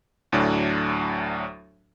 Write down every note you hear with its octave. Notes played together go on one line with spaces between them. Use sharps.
D2 A2 F#3 D4